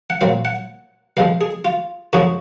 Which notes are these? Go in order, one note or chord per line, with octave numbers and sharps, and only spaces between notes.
F#5
A#2 F#3 C4 F5
F#5
C#2 C3 F3 G#3 F5
G#4
F4
F#2 C#3 F3 G#3 D#4 F#4